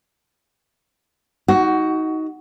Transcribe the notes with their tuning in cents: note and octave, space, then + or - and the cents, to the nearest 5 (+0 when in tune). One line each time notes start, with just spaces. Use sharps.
D#4 +20 F#4 +15